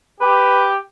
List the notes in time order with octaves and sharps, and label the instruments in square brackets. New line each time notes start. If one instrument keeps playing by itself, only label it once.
[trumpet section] G4 [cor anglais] B4